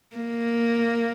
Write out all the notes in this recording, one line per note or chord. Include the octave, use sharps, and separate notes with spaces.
A#3